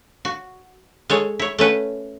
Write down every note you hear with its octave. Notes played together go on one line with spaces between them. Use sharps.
F#4
G#3 A4 C#5
E4 C#5
A3 C#4 B4 F#5